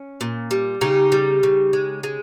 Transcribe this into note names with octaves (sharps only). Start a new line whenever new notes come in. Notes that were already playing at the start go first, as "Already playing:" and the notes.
Already playing: C#4
A#2
G3
C#3 D#4 G4
G3
C#3
G#3
G#3